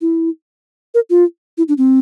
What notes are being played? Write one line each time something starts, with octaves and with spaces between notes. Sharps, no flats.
E4
A#4
F4
E4
D4
C4